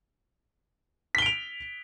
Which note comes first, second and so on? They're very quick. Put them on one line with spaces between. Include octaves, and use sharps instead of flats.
B6 G7 D7 F7